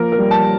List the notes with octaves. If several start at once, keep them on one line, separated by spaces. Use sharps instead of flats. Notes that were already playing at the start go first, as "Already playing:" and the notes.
Already playing: F3 A#3 A#4
A#4
G3
A5